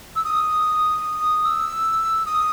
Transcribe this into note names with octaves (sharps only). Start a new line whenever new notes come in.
E6
D#6
E6
D#6